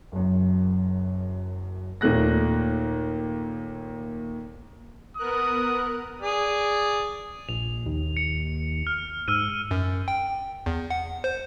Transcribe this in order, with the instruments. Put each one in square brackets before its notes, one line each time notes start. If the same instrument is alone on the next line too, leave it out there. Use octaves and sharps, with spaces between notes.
[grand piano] F#1 F#2
D#2 A#2 A3 F#6 A#6
[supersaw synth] B3 A#4 F#6 [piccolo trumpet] D#6
[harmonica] G#4 D5
[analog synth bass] A#1 [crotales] F7
[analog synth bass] D#2
[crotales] C#7
F6
[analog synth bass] G#2 [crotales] E6 F6 D#7
[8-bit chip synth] F#2
G5
E2
F#5
C5